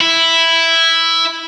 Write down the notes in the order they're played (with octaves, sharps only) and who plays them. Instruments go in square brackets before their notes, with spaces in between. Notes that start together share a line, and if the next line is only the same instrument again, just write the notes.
[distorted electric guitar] E4